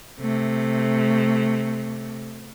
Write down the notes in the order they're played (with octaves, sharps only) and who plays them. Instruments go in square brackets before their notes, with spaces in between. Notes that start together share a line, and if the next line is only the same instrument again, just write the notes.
[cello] C3 A3